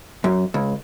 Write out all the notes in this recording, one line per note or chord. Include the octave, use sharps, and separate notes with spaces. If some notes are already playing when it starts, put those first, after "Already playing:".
F#2
C#2